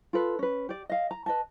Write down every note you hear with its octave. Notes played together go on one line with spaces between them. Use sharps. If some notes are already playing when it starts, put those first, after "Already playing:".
F4 A4 B4
C#4 B4
G4 D5
D#5 F5
A#5
B4 D#5 A5